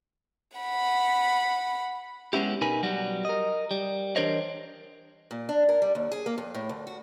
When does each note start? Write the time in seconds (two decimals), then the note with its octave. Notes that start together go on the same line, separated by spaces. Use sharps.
0.58 F#5 B5
2.33 G#3 B3 C#4 E4 G4
2.61 B2 D#4 A#4 B4 G#5 B5
2.83 B1 F#3 G3 F#4
3.25 A#4 D#5
3.71 G3
4.16 E3 D4 A#4 C5 C#5 D#5
5.31 A#2
5.49 D4
5.69 A#4
5.82 G3
5.95 D#2
6.12 G#4
6.26 A#3
6.38 F2
6.54 A2
6.69 D2
6.87 F#4